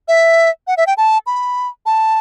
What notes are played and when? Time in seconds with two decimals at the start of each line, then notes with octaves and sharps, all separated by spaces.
0.08 E5
0.67 F#5
0.77 E5
0.87 G5
0.97 A5
1.26 B5
1.86 A5